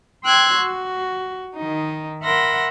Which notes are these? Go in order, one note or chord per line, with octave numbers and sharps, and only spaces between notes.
G5 C6 E6 F#6 G#6
F#4
D#3 D#4
A#4 E5 F#5 B5 C6 A#6